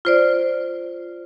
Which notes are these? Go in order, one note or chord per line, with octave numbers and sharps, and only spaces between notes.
F4 C5 D5